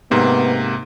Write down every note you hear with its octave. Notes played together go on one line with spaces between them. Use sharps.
G#2 C3 A#3 B3